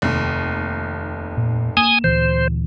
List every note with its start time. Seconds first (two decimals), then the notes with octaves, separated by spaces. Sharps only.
0.02 F1 D#2
1.37 A#2
1.77 A#3 G#5 D#6 E7
2.04 D2 A#2 E3 C5